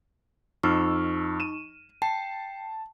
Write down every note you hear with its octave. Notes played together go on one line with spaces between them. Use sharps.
F2 D#4 C#6 E6 F6
D#7 E7
G5 A5 C7